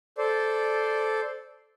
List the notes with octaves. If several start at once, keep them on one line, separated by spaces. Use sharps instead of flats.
A4 C5 D5